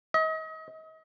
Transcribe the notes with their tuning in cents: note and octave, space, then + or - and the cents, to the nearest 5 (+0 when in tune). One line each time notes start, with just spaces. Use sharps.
D#5 +35